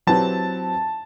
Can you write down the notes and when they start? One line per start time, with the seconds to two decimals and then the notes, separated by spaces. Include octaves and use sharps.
0.07 F#3 C4 E4 G4 B4 A5